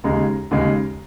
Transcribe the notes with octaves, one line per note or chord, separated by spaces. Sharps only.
D#2 C#3 G#3 A#5
D#2 C#3 G#3